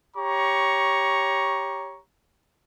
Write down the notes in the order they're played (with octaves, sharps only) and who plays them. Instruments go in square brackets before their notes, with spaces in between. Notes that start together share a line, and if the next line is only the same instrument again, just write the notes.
[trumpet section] G4 C#5 A#5 C#6